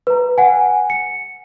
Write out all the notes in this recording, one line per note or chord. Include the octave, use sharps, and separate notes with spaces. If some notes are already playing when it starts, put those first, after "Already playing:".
B4 A#5
F#5 G#5
C#7